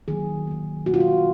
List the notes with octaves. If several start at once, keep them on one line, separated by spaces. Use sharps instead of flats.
D#3 F#3 A#3 G#4
D#3 A#3
B2 A#3 F#4
F4
F#4